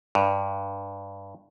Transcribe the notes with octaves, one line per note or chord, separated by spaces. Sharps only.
G2